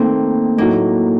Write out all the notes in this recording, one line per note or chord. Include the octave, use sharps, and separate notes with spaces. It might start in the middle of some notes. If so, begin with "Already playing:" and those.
Already playing: D#3 A3 A#3 C4
A2 F#3 A3 A#3 D#4